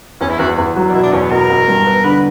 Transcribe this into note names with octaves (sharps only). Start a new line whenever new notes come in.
E2 C#4
E4
E2 F#4
E2
F#3
D4
B2 E4
D4
E2 C#4
B3
B2 A#4
E2
G2
B3
D3 B4